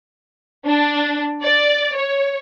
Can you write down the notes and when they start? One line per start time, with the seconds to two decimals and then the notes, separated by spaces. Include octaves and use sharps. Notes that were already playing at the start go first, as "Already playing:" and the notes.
0.66 D4
1.43 D5
1.95 C#5